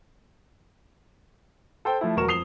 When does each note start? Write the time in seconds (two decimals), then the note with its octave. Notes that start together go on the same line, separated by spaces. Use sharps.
1.85 A4 C5 G5
2.01 F3 A3 E4
2.16 E1 F#3 A#4 C#6 E7
2.28 F2 D#6 C7 F7 G7